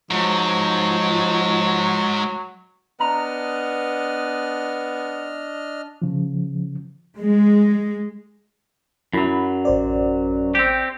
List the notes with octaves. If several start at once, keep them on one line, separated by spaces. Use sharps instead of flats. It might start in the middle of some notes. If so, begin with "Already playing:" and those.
G#2 F3 F#3
B3 D4 D#5 A#5 F6
C#3 F3
G#3
F#2 F#3 E4 B5
A1 C5 D5
C4 G4